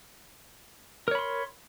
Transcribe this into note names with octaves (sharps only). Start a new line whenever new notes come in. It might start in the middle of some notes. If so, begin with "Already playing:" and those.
A#4 C#5 B5 C6